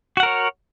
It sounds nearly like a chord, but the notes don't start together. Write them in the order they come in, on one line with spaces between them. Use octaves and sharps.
F#4 F#5 A#4 C#5